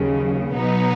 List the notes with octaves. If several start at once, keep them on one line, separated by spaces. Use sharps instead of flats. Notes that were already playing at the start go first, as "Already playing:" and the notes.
Already playing: D#2 C#3 F#3
B2 F#3 B3 D#4